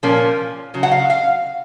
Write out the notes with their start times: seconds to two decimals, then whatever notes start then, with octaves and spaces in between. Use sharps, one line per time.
0.03 A#2 F3 A#3 C#4
0.74 C#3 F#3
0.83 F#5
0.91 F5
1.10 F5